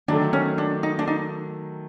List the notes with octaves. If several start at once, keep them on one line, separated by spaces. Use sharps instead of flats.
D#3 F#3 A3 D4
C#4
D4
D#4
D4
D#4